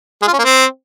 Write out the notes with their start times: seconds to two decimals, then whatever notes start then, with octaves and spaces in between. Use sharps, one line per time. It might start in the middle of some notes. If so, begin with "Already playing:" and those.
0.22 G#3
0.28 F4
0.33 C#4
0.39 A#3
0.44 C4